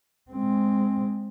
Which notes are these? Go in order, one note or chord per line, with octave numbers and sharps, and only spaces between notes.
G#3 C4